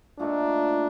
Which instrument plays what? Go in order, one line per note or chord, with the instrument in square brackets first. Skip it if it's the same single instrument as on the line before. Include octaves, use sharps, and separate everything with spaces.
[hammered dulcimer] A#2 A3 D#4 A4 [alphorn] D4